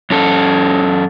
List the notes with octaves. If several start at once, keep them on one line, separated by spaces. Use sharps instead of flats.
F#2 C#4 A4